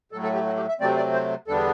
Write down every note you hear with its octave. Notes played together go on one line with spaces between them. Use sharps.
A2 F#3 A3 A4
A4
G4
F#4
G4
E5
C3 F#3 A3 C4 D5
D5
C5
E2 D3 G3 B3 D4 A4